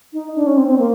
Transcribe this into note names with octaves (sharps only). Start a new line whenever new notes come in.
D#4
D4
C#4
C4
C4
A#3